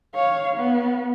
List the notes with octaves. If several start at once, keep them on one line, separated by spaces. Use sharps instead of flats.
C#5 F5
B3